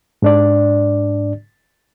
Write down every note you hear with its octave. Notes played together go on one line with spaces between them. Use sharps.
G#2 D4 D5